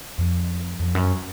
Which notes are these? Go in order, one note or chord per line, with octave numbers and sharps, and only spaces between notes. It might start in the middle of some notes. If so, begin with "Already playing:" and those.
F2
F2
F#2